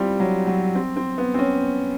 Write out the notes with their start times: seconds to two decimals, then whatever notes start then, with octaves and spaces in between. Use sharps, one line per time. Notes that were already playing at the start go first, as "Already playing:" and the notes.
Already playing: G3 C4 E4 F4
0.20 F#3
0.47 F#3
0.75 C4
0.96 C4
1.18 B3
1.34 C4
1.39 C#4